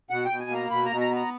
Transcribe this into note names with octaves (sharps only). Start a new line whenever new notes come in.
B2 F#5
G5
B2
G#5
A#3 A#5
B2 B5
A#5
B2
A#5
B3
A#5